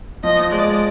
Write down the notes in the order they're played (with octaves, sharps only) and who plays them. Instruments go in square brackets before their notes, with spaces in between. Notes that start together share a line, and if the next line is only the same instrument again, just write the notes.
[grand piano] F3 [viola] D#5
[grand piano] G#3 [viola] D5